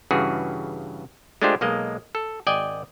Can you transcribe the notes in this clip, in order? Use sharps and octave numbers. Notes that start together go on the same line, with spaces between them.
G2 C#3 E3 F#4 G#4
G#3 A3 D4 F4 G4 C5
B1 G#3 A#3 D#5
A4
G#1 D5 D#5 G5 G#5